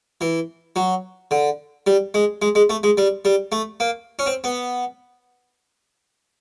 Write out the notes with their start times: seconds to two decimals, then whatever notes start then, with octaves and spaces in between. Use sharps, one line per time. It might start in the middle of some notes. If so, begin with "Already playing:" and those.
0.21 E3
0.76 F#3
1.31 D3
1.87 G3
2.14 G#3
2.42 G#3
2.55 G#3
2.70 A3
2.83 G#3
2.97 G3
3.25 G3
3.52 A3
3.80 A#3
4.19 C#4
4.27 C4
4.44 B3